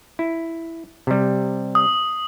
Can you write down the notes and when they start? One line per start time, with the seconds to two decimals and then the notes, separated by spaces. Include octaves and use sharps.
0.19 E4
1.07 C3 G3
1.75 D#6